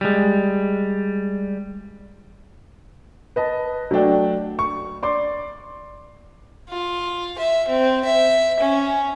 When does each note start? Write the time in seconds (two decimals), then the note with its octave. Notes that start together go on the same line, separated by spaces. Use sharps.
0.01 G3 G#3
3.36 B4 D#5 A5
3.91 F#3 A3 D4 G5
4.59 C#6
5.03 D5 C6 D6
6.70 F4
7.38 E5
7.68 C4
8.05 E5
8.60 C#4